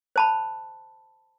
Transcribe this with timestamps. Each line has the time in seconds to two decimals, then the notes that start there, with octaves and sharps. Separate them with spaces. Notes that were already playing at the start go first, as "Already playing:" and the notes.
0.16 C5 A5 B5